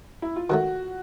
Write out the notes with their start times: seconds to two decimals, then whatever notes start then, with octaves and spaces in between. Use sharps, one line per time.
0.22 E4
0.36 F4
0.50 D#3 F#3 A3 F#4